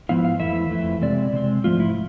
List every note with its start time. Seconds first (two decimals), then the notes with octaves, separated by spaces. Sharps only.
0.09 G#2 F3 B3 E4 F5
0.25 F5
0.40 F2 E3 A3 E4 E5
0.70 F2 E3 A3 E4
1.01 C3 G#3 C4 D5
1.33 C3 G#3 C4
1.64 G#2 F3 A3 F4
1.80 E4